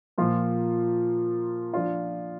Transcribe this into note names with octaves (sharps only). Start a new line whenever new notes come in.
A#2 F3 A#3 F4
F3 D4 F4